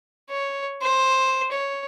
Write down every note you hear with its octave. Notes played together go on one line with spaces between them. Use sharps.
C#5
C5
C#5